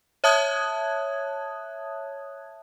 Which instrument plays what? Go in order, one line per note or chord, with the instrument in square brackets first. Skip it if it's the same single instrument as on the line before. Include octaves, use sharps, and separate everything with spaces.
[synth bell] C#5 E5 A5 D#6 F#6 G#6